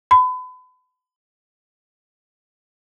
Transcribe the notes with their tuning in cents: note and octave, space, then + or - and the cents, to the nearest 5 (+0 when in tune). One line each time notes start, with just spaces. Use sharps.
B5 +35